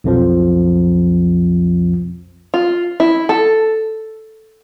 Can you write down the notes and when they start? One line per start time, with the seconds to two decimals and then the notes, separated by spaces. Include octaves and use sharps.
0.04 B1 F2 F3
2.54 F4
3.00 E4
3.29 A4